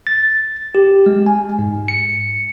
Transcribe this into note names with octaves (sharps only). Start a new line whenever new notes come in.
A6
G4
G#3
G#5
G#2
C#7